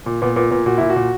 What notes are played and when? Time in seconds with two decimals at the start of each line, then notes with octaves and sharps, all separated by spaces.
0.06 A#2
0.22 A#2 B3
0.36 A#2 B3
0.51 A#2 B3
0.66 A#2 F#4
0.78 A#2 E4
0.90 F#4
0.96 A#2